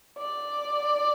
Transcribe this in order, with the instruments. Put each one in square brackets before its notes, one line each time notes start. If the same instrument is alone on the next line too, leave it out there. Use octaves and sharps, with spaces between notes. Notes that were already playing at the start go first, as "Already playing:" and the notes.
[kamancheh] D5